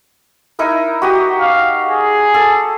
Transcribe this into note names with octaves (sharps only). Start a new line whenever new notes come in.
D#4 E4 A#4
F#4 G4 D#6
F5
G#4
A4 A5